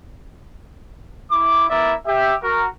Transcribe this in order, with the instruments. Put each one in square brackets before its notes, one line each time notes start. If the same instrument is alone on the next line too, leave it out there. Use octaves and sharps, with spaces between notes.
[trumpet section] E4 D6
B3 E4 A#4 D5 E5
G4 E5
F#4 A#4